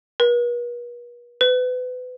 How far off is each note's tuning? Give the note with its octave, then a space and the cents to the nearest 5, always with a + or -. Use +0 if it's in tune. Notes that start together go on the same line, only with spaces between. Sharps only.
B4 -45
B4 +30